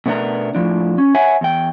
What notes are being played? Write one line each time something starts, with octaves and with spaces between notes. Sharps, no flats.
B2 A3 B3 D4 A#4
A2 F3 D4
C#4
C#5 E5 F#5 G#5
E2 G5